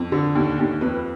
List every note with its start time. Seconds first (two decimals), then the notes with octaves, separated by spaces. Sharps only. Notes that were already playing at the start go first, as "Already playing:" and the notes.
Already playing: F2
0.12 D3
0.35 D#2
0.59 D#2
0.81 F2 B4